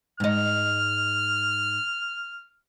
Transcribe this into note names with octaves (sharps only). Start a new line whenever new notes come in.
G#2 D#5 F6